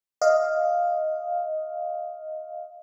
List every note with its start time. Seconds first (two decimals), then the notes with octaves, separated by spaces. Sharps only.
0.22 D#5 F5